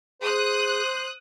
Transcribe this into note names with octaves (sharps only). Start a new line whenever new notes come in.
G#4 C5 D#6 F#6